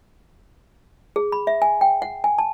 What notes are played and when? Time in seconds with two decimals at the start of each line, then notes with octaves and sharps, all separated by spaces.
1.16 G#4
1.32 B5
1.47 E5
1.62 G#5
1.81 G5
2.02 F#5
2.24 G#5
2.38 A5